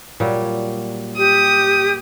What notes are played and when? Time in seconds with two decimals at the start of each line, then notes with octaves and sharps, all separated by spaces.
0.20 A#2 F#3 G3
1.17 G4 D#6